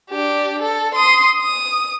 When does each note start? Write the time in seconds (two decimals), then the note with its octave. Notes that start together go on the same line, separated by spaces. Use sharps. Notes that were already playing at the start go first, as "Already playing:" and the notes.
0.10 D4 G4
0.62 A4
0.95 C6 D#6
1.41 D#6